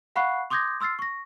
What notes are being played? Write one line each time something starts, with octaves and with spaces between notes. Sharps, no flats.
F5 F#5 B5 C#6 F#6 C7
C6 D6 D#6 G6 G#6 A#6
C6 E6 F6 A6 C7
C#6 A#6